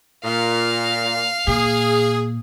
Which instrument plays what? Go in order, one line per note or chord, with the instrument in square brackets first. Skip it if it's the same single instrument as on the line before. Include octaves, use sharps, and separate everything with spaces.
[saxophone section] A#2 [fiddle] F5
[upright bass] A#2 [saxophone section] G#4